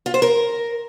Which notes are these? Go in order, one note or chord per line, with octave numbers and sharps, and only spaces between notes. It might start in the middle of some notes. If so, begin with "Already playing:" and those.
F4
C5
A#4